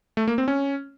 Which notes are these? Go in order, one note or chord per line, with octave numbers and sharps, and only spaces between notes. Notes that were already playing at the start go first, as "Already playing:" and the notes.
A3
A#3
C4
C#4